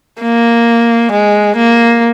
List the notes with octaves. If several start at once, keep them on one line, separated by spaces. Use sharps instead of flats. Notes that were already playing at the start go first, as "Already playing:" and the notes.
A#3
G#3
A#3